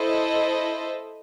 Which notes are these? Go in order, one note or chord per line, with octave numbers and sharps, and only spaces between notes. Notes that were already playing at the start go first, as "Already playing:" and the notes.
Already playing: E4 A4 C5 D#5